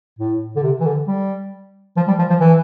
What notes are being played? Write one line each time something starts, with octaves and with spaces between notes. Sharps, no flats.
A2
D3
C3
E3
D3
G3
F3
G3
F3
F3
E3